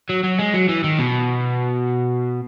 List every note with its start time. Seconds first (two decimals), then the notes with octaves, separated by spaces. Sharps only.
0.09 F#3
0.23 F#3
0.39 G#3
0.54 F#3
0.69 E3
0.84 D#3
0.99 B2